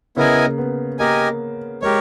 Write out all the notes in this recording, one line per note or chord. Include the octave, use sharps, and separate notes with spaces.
C#3 B3 E4 A#4 D#5 G#5
A#3
B3
A#3 G4 A#4 D#5 G#5
G#3 G4 A#4 C#5